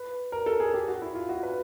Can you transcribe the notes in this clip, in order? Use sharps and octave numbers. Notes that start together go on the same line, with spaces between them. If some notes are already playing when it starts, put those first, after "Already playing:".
Already playing: B4
A#4
A4
G#4
G4
F#4
E4
F4
F#4
B4